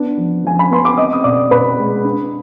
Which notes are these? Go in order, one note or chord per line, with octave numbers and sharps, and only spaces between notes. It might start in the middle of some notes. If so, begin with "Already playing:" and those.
Already playing: B3 D4
F3
F3 G#5
B5
B3 C6
D6
C4 D#5 D#6
D#6
B2 D5 D6
B2 B4 B5
G#3
D4